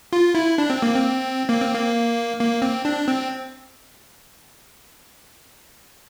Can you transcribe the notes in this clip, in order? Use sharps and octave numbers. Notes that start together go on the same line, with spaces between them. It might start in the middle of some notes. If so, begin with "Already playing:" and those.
F4
E4
D4
C4
A#3
C4
A#3
C4
A#3
A#3
C4
D4
C4